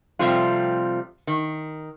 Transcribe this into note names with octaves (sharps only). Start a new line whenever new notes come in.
C3 F3 G3 A3 C4 F4
D#3